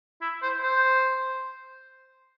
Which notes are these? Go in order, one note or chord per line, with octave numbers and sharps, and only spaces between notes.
E4
C5
C5